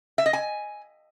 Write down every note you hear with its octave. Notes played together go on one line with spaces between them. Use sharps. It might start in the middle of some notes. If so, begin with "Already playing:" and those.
E5
D#5
G#5